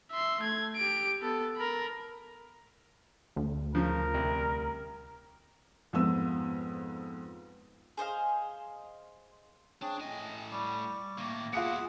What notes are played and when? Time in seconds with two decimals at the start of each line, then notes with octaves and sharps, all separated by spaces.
0.11 E5 C6
0.40 A3 G#6
0.77 G4 D7
1.21 B3 A4
1.56 A#4 B5
3.36 D2
3.75 C#3 F3 A#4
4.14 C2
5.93 F2 G#2 B3 E6
7.97 G#4 C5 D#5 F5
9.82 C4 D4 G#4 C#5
10.00 A2 D#5 G#5
10.52 G3 C#6 D6
11.18 A2 D#3 A#3
11.53 B2 E4 F4 G#4 F#5 C#7